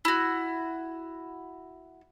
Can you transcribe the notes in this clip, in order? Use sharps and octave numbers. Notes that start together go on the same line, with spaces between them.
E4 F#4